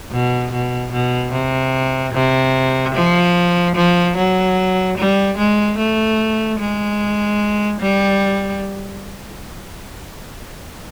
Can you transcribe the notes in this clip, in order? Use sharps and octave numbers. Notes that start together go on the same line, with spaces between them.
B2
B2
B2
C3
C3
F3
F3
F#3
G3
G#3
A3
G#3
G3